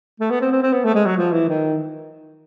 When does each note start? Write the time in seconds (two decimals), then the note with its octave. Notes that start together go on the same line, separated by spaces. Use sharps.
0.20 A3
0.30 B3
0.41 C4
0.51 C4
0.62 C4
0.73 B3
0.84 A3
0.94 G#3
1.06 F#3
1.16 F3
1.32 E3
1.48 D#3